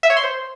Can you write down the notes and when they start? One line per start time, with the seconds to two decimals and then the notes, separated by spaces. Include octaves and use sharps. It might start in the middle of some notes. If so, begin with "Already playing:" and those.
0.03 E5
0.10 C#5
0.17 C6
0.23 C5